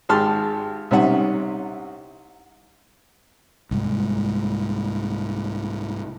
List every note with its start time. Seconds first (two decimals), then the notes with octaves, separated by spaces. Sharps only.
0.09 G#1 G4 G#4 A5 C6 F6
0.91 C2 C3 C#4 D#4 E5 F#5
3.71 C2 G#2